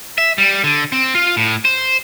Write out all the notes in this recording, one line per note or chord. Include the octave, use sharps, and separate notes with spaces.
E5
G3
D3
C4
F4
A2
C5